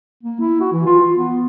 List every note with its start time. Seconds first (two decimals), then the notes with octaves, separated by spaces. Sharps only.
0.23 A#3
0.40 E4
0.60 F#4
0.73 E3
0.86 F4
1.13 B3